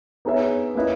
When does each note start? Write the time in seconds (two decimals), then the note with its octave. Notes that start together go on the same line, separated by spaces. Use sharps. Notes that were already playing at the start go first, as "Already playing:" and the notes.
0.25 B3 D#4 G#4 C#5 E5
0.75 A#3 C#4 E4 B4 D#5